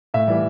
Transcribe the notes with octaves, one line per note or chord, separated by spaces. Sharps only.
A2 E5
E3 G3